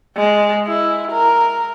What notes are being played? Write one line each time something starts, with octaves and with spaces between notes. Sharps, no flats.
G#3
E4
A#4